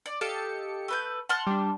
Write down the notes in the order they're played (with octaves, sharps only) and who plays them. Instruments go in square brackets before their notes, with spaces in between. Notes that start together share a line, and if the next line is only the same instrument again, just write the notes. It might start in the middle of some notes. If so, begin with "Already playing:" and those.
[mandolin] D5
[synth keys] G4 A4 C#7 [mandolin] D#5 F5
[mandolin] A3 B4 G6
[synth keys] F#5 [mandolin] A5 C6 F6
[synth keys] G3 D4